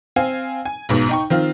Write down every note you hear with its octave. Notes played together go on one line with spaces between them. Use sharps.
C4 F5 G#5
G#5
B1 G#2 B2
D#4 G5 C#6
D#3 C4 F4